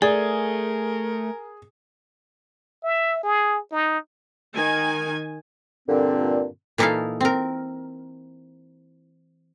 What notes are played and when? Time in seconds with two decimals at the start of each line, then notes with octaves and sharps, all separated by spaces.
0.02 A3 G#4 A#4 D5
2.84 E5
3.23 G#4
3.72 D#4
4.55 D#3 G#5
5.88 G2 A#2 D3 C4
6.78 A#2 E3 D#4 E4 A4 F5
7.21 C4 A#4